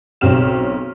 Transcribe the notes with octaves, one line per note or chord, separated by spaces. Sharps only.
B1 C#3 C4 F6 E7